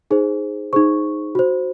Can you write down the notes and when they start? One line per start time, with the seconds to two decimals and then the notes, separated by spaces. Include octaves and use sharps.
0.11 D#4 G#4 C5
0.73 D#4 G#4 C5 C#6
1.35 F#4 C5